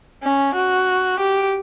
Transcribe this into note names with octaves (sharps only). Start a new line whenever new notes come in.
C#4
F#4
G4